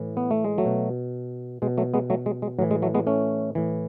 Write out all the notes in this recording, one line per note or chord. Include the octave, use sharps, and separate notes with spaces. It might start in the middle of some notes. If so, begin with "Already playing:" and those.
Already playing: A2 E3
B3
A3
G#3
F#3 A3
B2
B2 G#3
F#3 A3
G#3 B3
F#3 A3
G#3
G#3
A2 E3 F#3
G#3
F#3 A3
G#3 B3
A3 C#4
A2 E3